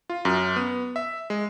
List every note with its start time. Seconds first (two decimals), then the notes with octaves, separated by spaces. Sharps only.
0.10 F4
0.25 F#2
0.56 B3
0.96 E5
1.30 G#3